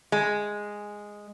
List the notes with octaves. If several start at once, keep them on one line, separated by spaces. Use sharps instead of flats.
G#3